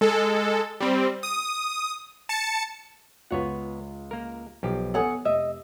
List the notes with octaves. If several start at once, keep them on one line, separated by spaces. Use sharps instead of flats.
G#3 A4
G3 C4
D#6
A5 C#7
C#2 B3 F4 C#5 F#5
A#3 A#4
B1 F3 G4
B3 A4 C#5 F#5 G#5 D#6
F1 D#5 E5